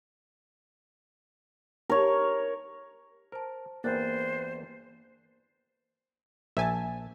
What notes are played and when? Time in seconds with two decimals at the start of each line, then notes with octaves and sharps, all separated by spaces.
1.90 A#4 C#5
3.32 A#4 C5 A5
3.84 E2 G2 G3 A#3 A#4 C5 F#6 A6
6.57 A#1 E5 G#5 A5